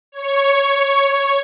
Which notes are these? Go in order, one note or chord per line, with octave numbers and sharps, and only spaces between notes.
C#5 C#6